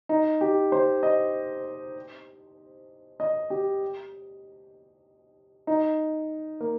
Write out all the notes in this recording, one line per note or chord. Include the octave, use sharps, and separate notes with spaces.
D#4
G4
C5
D#5
D#5
G4
D#4
A#3